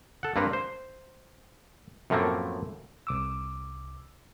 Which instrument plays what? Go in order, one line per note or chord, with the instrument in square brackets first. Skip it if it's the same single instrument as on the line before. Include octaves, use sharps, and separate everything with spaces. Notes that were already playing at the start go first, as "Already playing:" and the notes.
[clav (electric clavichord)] A4 F#5
G2 A#3 C4 B4 A#5
C5
F#2 A2 F3 A3 A#3 C4
[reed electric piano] C2 D6 E6